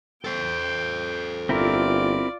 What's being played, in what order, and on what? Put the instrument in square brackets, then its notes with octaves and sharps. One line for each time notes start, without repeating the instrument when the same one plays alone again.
[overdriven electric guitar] A4 C5 [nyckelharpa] G5
[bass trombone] G1 [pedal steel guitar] C4 E4 A#4 [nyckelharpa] F4 D5